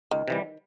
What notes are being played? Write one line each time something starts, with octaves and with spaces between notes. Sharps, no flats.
C#2 D#3
C3 E3 G3